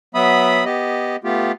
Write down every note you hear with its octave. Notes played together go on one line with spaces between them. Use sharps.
F#3 B3 E5 B5 D#6
B3 G4 D#5
A3 B3 F4 G4